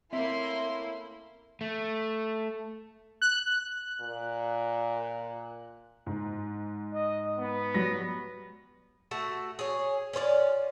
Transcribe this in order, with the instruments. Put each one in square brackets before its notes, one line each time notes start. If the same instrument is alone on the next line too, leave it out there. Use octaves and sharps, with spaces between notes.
[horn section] A3 C#4 E4 [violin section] A#3 C6 [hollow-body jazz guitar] C4 E5
[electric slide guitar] A3
[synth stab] F#6
[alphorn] A#2
[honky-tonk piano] G#2
[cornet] D#5
B3
[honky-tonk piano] F#3 G3 A#6
[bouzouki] A3 F#4 A4
G#4 C#5
C#4 F4 C5 D5